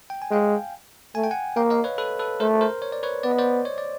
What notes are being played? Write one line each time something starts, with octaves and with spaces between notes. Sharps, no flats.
G5
G#5
G#3 F5 G5
A3 G#5
G5
F#5 G#5
A#3 F5 G5
D#5 F5
B4 C#5
A4 B4
A4 B4
A3 A#4 C5
A#4 C5
C#5
D5
B4 C#5
B3 D5
D#5
C5 D5
C#5
D5